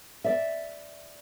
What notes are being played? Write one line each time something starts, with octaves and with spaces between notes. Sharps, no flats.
D5 E5